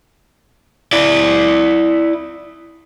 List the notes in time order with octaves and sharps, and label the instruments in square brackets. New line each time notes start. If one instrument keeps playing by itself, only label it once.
[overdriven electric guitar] E4 D5